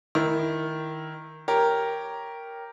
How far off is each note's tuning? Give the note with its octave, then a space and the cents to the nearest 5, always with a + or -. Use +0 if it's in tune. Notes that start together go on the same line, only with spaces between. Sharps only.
D#3 +0 E4 +0
G4 +0 A#4 +0 C#5 +0